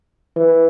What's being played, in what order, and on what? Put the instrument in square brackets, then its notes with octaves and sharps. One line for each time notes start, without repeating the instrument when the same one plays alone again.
[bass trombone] E3